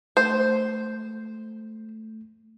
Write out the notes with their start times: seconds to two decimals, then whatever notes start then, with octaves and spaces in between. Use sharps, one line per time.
0.17 A3 C5